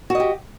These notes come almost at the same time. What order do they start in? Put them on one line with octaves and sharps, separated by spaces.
F#4 D#5 G4